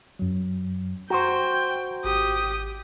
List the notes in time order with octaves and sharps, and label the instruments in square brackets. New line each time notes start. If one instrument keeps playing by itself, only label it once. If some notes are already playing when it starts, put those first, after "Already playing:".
[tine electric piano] F#2 F#3
[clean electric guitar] F#4 C5 [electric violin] G5 [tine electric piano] A#5 C#6
[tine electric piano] G#1 [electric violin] G4 D#6